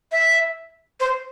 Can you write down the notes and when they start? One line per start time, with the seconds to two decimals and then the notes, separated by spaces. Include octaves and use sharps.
0.12 E5
1.00 C5